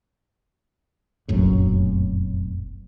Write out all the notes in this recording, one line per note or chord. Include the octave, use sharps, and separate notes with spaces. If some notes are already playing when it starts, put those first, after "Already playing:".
F1 A#1 F#2 A2